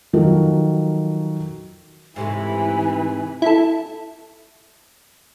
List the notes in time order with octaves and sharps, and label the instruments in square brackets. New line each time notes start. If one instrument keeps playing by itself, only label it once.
[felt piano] D#3 F3 F#3 A4 A#4
[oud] G#2 C3 A3 [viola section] E3 B4 [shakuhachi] G#5
[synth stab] E4 A4